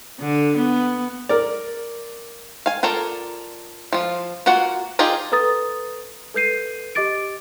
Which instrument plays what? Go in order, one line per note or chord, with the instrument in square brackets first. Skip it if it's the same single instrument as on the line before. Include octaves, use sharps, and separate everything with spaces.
[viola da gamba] D3
B3
[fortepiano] A#4 D5
[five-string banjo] F5 G#5
F4 A4 A#4 D5
F3 F4
A#3 F4 F#4 F#5
D#4 F4 G4 G#4 D5
[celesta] A4 B4 A#5 D#6 A6
A4 B4 G6 C7 D#7
G4 D#5 D6 A6 D7